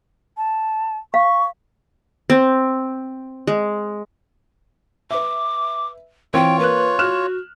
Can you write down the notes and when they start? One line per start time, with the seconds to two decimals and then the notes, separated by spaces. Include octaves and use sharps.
0.37 A5
1.14 F5 C#6
2.30 C4
3.47 G#3
5.11 B4 E5 D6
6.34 E3 C4 F4 C#5 G5 G#6
6.59 A#3 B4 F#6
6.99 F#4 F6 F#6 E7